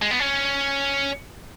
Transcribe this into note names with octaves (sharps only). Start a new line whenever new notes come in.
G#3
B3
C#4